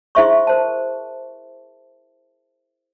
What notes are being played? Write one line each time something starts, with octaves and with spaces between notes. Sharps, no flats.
E4 G#4 C5 E5 C6 C#6
A#4 C5 A5